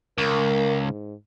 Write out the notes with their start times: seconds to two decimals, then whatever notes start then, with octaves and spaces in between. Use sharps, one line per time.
0.18 C#2 A#4
0.86 G#2